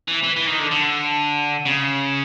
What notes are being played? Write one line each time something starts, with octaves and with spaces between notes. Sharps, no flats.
E3
E3
E3
D#3
D3
D3
C#3